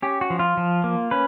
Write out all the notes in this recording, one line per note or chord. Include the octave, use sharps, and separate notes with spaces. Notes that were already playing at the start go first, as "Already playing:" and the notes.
C#4 G4
F#4
F3
F4
F3
A#3
C#4 B4